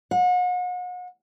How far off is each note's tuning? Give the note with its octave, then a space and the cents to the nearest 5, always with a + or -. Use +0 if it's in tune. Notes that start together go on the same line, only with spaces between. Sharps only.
F#5 -40